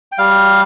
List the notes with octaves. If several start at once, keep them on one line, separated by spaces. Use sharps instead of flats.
G5
G3 F5